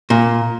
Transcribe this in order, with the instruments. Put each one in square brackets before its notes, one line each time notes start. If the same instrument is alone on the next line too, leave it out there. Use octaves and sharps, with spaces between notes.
[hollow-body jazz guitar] A#2